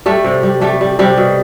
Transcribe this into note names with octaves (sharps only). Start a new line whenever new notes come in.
G3 A3
C3
G3
G3 A3
G3
C3 G3
B2